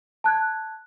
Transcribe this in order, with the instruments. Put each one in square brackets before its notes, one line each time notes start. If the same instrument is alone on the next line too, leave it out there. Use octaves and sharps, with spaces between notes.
[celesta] A5 F#6 G#6